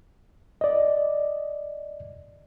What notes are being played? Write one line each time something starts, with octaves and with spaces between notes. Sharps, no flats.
D5 D#5